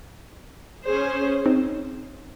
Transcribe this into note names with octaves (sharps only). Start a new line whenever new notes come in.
C#4 G#4 C5
C4 D#4